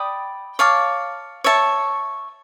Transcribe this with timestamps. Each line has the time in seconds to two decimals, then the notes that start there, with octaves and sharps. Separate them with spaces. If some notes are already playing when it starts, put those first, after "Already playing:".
Already playing: D5 G5 B5 D#6
0.59 C#5 F5 A5 D6
1.44 C#5 E5 A5 C#6